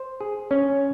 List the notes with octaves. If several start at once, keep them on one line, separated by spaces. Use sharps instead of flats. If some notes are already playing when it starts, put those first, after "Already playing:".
Already playing: C5
G#4
C#4